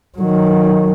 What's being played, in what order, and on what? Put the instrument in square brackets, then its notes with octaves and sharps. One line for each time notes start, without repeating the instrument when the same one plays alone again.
[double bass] D#3 F#3